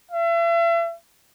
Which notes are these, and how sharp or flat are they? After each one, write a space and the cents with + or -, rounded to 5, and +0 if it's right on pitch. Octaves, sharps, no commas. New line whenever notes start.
E5 +40